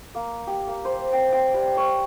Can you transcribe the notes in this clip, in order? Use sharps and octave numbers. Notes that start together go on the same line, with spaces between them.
A#3
G4
A#3
C5
G5
G5
G3
C#5